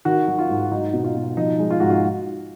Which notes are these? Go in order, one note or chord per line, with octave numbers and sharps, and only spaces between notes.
D#3 F#4
F#3
F4
G#2
F#3 D#4
B2
F4
B2
F3 D#4
G#3
F4
G#2 F#4
F4